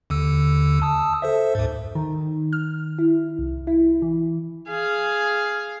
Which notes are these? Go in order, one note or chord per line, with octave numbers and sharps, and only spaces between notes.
D#2 D3 E6
A5 D#6 E6
A4 C5 E5
D#2 G#2
D#3
F6
E4
C2
E4
E3
G#4 F5